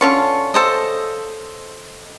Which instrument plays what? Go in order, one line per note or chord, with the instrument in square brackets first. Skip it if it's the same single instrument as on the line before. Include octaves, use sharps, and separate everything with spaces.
[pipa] D3 C#4 F4 [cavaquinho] C#6
[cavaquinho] A4 C5 D#5